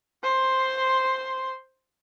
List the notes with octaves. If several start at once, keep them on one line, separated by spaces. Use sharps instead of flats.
C5 C6